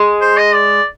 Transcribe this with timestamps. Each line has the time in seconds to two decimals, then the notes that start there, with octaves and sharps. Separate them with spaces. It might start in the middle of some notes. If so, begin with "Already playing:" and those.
Already playing: G#3
0.21 C5
0.37 D#5
0.54 D5